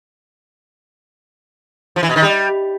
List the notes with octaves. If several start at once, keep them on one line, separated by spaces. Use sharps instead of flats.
F3
E3
B2
D#3
G3